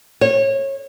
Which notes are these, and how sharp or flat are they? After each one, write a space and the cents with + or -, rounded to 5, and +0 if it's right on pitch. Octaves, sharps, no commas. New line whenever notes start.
C#5 -25